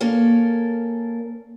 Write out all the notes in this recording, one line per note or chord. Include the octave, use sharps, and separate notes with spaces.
A#3 C#4 A4 A#4